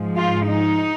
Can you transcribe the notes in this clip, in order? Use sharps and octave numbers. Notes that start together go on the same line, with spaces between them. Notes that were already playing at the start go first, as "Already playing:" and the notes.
Already playing: G#2 F3 G#3
F4
D#4